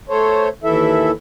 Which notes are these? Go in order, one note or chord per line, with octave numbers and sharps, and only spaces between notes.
A3 A4 C5 C#5
D#2 E3 E4 A4 E5